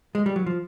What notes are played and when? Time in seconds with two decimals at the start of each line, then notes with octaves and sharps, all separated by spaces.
0.15 G#3
0.26 G3
0.36 F#3
0.46 F3